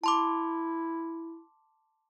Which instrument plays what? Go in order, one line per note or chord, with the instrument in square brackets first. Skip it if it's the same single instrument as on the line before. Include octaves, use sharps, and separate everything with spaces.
[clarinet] E4 [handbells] A5 C6 D6